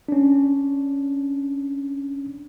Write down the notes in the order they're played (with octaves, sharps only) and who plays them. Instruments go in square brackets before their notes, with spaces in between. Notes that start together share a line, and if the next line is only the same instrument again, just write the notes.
[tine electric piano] C#4 D4